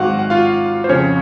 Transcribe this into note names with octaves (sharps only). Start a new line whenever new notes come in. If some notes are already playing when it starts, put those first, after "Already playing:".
Already playing: G#1 G#2 F#3 F#4 F5 F#5
F#5
F4 F5
C5
F2 C#3 F3 C4 C#4 C#5